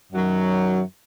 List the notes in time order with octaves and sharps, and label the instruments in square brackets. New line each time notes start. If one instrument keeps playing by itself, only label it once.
[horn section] F#2 D#3 F#3